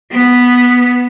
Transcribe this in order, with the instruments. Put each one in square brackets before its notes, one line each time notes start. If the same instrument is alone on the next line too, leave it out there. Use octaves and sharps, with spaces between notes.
[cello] B3